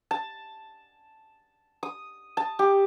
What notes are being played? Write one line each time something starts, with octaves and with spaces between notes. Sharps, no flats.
A5
D#6
A5
G4